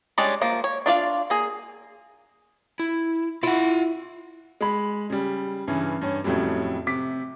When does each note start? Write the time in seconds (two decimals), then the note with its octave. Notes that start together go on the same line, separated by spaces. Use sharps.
0.18 G3 G#3 C#4 D4 D5
0.42 F3 A#3
0.64 C#5
0.86 D4 F4 D5 F5
1.30 A#3 G#4
2.79 E4
3.43 E4 F4 F#5
4.61 G#3 B5
5.10 C#3 G3
5.67 G2 C#3 E3
6.01 G2 C#4
6.24 F2 A2 C#3 F#3 G3
6.87 C3 D6 B6